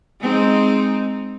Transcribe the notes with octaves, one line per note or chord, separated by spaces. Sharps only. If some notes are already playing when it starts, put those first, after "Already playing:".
G#3 C4 D#4